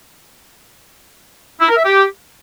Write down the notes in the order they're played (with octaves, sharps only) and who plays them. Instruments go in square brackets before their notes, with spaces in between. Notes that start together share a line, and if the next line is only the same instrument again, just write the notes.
[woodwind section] E4
A#4
E5
G4